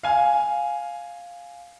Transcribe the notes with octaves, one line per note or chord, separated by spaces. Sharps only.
F5 G#5